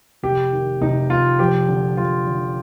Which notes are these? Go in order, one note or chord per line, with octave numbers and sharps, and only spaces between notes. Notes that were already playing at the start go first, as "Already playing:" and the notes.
F1 G4
D#3
F1 D#4
F1 F4
F3 G4
D3
F3 F4
D3